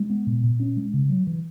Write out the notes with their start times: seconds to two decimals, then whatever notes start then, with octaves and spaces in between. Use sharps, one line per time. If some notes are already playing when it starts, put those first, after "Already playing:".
Already playing: G#3
0.10 B3
0.27 A#2
0.44 A#2
0.60 C#4
0.77 G#3
0.94 C#3
1.10 F#3
1.27 E3